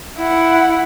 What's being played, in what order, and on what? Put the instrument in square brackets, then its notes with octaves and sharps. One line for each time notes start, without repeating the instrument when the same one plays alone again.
[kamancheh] E4 F#5